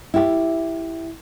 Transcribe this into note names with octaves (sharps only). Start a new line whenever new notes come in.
E4 G4